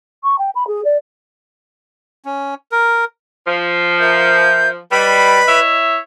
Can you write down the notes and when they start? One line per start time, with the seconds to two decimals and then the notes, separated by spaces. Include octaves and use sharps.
0.23 C#6
0.38 G5
0.55 B5
0.67 G#4
0.84 D5
2.25 C#4
2.72 A#4
3.47 F3
3.99 A#4 E5 G6
4.92 G3 B4 D#5 B5
5.48 E4 C#5 E5